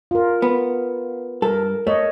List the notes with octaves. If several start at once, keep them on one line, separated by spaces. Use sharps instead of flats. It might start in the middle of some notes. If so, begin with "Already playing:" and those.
F4 A#4
B3
G2 A4 A#4
A3 C#5 D#5